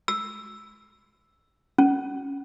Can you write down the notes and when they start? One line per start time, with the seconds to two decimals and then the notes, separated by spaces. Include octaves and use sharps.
0.08 E6
1.78 C#4